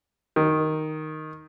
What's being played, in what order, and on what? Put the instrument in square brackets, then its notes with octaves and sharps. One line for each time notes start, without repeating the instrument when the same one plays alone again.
[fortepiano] D#3